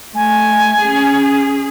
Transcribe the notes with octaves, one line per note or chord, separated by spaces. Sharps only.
A3 G#5
C#4 G#4